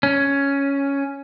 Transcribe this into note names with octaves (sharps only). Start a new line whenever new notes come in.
C#4